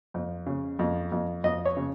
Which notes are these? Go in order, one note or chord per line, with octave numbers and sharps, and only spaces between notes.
F2
C#3
F2
F2
F2 D#5
C#5
C#3